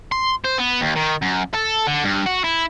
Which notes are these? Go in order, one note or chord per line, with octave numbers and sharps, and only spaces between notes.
C6
C5
B3
D#2
D#3
F#2
A4
D3
G2
F#4
E4